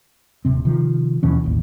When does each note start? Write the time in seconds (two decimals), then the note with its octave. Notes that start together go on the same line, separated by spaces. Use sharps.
0.45 D#1 C3 C4
0.65 C3 D#3 F3
1.23 D#2 B2 E3 C#4
1.44 E1 A1 D#2